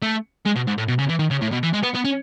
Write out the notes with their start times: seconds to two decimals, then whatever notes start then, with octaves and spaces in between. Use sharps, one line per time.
0.02 A3
0.45 G#3
0.55 B2
0.67 G#2
0.78 A2
0.88 B2
0.99 C#3
1.09 E3
1.19 D#3
1.31 C#3
1.41 A2
1.52 B2
1.63 E3
1.73 G#3
1.83 B3
1.95 B3
2.05 C#4